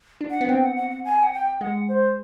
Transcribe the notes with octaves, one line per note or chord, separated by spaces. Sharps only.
D4
F#5
B3
C4 G5
F#5
F#5
F#5
G#5
F#5
G5
G#3 F#5
C5